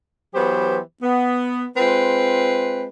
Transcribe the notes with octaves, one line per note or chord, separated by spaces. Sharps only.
E3 F#3 B3 G4 C5
B3
G#3 C4 F4 B4